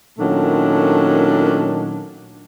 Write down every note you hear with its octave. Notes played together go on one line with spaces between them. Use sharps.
A#2 D#3 F#3 A3 C#4 D4